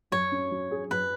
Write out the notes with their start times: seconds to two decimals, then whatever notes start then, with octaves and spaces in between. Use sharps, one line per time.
0.12 F#2 C#5
0.32 C#4
0.51 F#3
0.71 G#4
0.91 F#2 B4